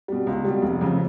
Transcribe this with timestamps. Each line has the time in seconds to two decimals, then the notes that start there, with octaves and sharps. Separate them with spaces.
0.08 B2 G3
0.27 C#2
0.45 B2 G3
0.62 F1
0.81 F2 C#3